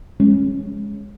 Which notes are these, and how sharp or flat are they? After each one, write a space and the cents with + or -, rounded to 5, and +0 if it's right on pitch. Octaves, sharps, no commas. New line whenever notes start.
G#3 +0 C#4 -10